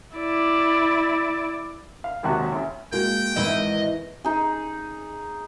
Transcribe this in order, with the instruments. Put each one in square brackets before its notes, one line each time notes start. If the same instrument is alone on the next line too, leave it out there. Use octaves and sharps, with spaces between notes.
[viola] E4 D5
[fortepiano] F5
G#1 D#2 C3 F#4 F#5
A1
[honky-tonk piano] G#3 F#4 [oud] A#3 [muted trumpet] G5
[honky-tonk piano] G#1 G#2 [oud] E3 E4 [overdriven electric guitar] D#5
[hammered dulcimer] D#4 G#4